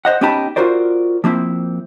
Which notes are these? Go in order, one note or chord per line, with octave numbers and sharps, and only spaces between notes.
C5 D#5 F#5
B3 C#4 D#4 G4 A5 B5
F4 F#4 A#4 C5 D5
F3 A#3 C4 E4